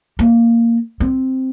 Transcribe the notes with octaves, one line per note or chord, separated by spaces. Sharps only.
A#3
C4